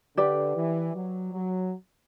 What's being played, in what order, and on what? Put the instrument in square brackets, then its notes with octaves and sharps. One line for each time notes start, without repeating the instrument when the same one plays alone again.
[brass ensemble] D3 [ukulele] G4 B4 D5
[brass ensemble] E3
F#3
F#3